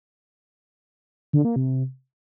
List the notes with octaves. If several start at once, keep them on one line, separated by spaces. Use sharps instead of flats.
D3
A#3
C3